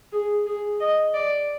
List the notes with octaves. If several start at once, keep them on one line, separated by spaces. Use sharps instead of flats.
G#4
G#4
D#5
D5